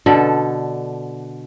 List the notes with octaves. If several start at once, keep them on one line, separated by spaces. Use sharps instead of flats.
B2 D3 A4